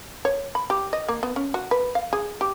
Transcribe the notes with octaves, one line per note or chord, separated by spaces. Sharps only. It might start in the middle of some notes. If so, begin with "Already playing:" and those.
C#5
B5
G4
D#5
A#3
B3
C#4
F#4
B4
F5
G#4
G4